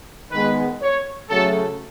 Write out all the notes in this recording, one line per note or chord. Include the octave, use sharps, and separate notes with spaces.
D#3 G#3 B3 B4
C#5
C#3 F#3 A3 A4